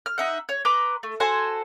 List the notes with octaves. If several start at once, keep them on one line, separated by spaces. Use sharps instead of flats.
F6
D#4 E5 F#5
C#5
B4 A#5 C6 D6
A3
F#4 A4 C5 G#5